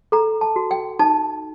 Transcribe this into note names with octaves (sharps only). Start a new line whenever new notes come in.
A4 A#5
A5
F#4
G5
D#4 A5